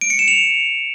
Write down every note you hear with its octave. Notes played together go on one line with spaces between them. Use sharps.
D7
C#7
E7
F7